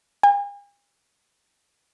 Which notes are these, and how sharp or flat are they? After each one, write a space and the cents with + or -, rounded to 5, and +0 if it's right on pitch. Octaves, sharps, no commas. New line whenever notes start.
G#5 -45